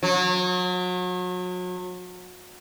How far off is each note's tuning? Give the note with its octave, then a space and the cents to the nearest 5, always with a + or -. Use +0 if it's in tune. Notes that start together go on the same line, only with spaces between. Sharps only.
F#3 -35